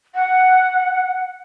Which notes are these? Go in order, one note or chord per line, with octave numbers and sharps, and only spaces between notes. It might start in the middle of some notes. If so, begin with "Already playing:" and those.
F#5